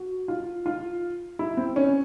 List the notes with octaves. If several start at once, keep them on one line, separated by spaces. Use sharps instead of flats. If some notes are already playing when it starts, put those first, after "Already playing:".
Already playing: F#4
F4
F4
E4
C4
C#4